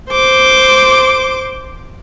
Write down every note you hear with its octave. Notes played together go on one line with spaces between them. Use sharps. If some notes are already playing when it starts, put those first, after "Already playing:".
C5 D6